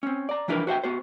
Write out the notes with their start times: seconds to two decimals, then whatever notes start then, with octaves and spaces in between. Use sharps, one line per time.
0.03 C4 C#4
0.29 D5 A#5
0.48 E3 F3 D4 E4 A#4 B4
0.67 F#4 C5 E5 G5
0.84 B3 F#4 C5